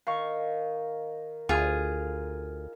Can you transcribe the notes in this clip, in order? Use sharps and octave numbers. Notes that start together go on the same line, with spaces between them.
D#3 F5 C#6
D2 F4 G#4